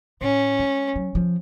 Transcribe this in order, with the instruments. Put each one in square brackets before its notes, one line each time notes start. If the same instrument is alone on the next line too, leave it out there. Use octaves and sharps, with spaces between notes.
[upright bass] A2 [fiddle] C#4
[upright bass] G#3
F#3
F3